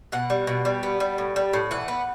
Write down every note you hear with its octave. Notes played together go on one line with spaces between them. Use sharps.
B2 F#5
G3
B2
G3
B3
G3
A2
G3
A2
E3 F#5
B3